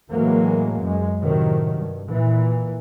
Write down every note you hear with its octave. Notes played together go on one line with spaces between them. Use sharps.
A2 E3 F#3 G#3 A#3
F#2 G#3
A2 C3 D#3 F#3
G2
A#2 E3